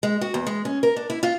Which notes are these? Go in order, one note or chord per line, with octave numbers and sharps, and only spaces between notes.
G#3
F#4
E2
G#3
C#4
A#4
D4
E4
F4